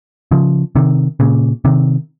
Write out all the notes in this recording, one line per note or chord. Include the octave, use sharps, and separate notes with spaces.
C#3 F3
C3 D#3
A#2 C#3
C3 D#3